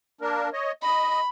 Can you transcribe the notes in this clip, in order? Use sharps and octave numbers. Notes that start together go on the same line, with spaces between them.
A#3 D4 A#4
C#5 D#5
D#5 B5